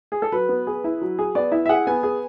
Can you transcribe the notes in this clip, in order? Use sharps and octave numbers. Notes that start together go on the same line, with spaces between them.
G#4
A4
F#3 B4
B3
G#4
E4
F#3
G#4
B3 D5
E4 E5
E5
G#4 F#5
B3 G#5
G#4